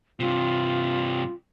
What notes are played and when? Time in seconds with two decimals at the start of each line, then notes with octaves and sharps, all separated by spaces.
0.20 G2 C3 F4